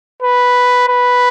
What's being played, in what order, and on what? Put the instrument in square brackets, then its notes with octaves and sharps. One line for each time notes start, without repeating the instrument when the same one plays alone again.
[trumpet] B4
B4